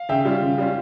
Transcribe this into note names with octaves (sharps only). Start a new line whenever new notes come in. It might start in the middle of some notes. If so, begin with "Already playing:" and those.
Already playing: F5
C#3 E5 G5
G3 C#4 F4
C#3
G3 C#4 F4